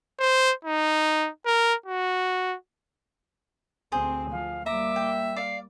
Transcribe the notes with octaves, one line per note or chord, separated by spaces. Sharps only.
C5
D#4
A#4
F#4
D2 C4 G#4 C5
F3 F5
G3 A#3 E5 A#5 D6
G5
D5 F5 C7